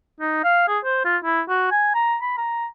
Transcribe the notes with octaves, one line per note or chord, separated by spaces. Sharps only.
D#4
F5
G#4
C5
F4
E4
F#4
G#5
A#5
B5
A#5